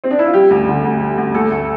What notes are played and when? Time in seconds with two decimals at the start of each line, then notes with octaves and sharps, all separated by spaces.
0.04 C4
0.11 D4
0.19 E4
0.26 F4
0.34 G3 G4
0.50 D2
0.67 D3
0.84 D2
1.01 G3
1.18 D2
1.34 A3 A4
1.51 D2